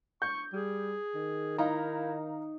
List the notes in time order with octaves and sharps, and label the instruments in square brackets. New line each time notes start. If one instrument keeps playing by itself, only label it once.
[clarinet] C#6 [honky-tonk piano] G6
[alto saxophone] G3 [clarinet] G#4
[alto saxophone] D#3
[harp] D#4 [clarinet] E4 [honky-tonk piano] F5 A#5